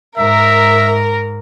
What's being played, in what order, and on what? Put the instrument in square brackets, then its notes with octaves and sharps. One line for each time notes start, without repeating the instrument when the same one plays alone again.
[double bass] G#2 [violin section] A#4 [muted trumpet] E5